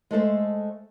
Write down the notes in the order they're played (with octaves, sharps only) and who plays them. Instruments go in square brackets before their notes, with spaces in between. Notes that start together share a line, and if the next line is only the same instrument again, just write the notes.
[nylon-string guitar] G#3 A3 A4 C5